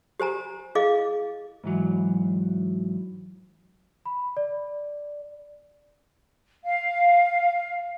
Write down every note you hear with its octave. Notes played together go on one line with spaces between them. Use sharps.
G4 C5 G#5 A#5
E4 G#4 D#5 F5 D6
G#2 E3 F#3
B5
D5
F5